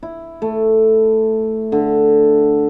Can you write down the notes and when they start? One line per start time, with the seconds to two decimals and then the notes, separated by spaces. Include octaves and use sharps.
0.03 E4
0.42 A3
1.72 D3